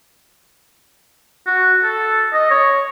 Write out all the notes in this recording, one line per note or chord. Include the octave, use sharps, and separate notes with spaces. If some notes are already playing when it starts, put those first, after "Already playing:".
F#4
A4
D#5
C#5